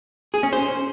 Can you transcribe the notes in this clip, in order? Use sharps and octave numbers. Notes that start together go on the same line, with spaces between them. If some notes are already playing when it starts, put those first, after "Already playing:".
G#4
C#4
C5